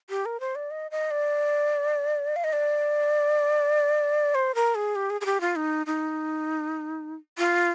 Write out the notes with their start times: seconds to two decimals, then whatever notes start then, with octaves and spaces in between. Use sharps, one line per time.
0.10 G4
0.26 A#4
0.40 C5
0.55 D5
0.71 D#5
0.91 D#5
1.11 D5
2.36 F5
2.44 D#5
2.53 D5
4.35 C5
4.55 A#4
4.75 G#4
4.96 G4
5.10 G#4
5.21 G#4
5.26 G4
5.41 F4
5.56 D#4
5.86 D#4
7.38 F4